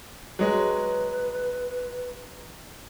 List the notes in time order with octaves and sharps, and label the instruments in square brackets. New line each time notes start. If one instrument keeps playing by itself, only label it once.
[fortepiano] F#3 G#3 [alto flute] B4